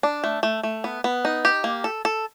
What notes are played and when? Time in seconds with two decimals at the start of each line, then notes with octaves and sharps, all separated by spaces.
0.03 D4
0.24 A3
0.43 A3
0.63 A3
0.84 B3
1.04 B3
1.25 D#4
1.45 G4
1.64 A#3
1.84 A4
2.05 A4